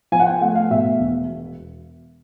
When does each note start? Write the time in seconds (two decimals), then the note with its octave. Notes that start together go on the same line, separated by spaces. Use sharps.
0.12 F3 G#5
0.20 F#5
0.27 G5
0.41 A3 F#5
0.55 F5
0.70 B2 E5
1.00 E1